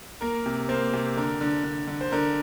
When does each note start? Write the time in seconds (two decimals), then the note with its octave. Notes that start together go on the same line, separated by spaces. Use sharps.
0.21 A#3 A#4
0.46 C3
0.69 A#3 C5
0.93 C3
1.17 D3 A#4
1.41 D3
1.64 D3
1.88 D3
2.01 C5
2.12 D3 A#4